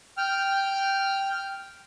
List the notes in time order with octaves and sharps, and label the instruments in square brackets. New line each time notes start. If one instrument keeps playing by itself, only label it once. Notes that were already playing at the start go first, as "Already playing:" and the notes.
[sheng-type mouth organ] G5 F6